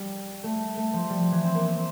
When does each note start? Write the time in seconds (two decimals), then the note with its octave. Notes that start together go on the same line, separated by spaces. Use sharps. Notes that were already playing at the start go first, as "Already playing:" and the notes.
Already playing: G3
0.43 A3
0.77 A3
0.93 F3
1.10 G3
1.21 F3
1.32 E3
1.43 C4
1.55 A#3
1.65 C4
1.76 C4